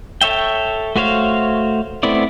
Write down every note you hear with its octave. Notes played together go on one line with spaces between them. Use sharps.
A4 C#5 E5 G5
A3 F#4 C5 C#5 F5
A3 B3 C4 E4 D5